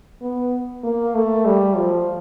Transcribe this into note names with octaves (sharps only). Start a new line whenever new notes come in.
B3
A#3
A3
G3
F3